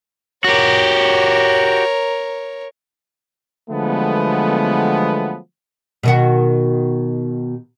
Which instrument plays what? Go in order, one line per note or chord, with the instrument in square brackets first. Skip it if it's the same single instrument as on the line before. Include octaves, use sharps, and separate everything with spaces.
[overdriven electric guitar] F#4 G4 [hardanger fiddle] A#4 C#5
[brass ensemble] D3 F3 F#3 G#3 A3 B3
[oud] B2 D#3 F#4